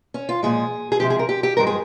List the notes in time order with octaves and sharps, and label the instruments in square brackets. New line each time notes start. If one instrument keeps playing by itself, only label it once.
[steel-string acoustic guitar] C#4
F4
A#2 F3 G#3 G#4
G#4
C3 F3 G#3 G4
G#4
A#4
G4
G4
G2 F3 G#3 A#4
G#4